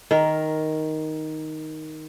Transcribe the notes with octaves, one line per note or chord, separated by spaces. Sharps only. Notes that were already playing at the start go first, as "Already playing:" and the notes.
D#3 A#4